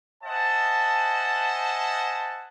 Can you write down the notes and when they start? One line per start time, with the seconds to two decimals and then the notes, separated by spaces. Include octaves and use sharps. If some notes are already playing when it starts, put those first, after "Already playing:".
0.24 C5 D#5 E5 F#5 G#5 A5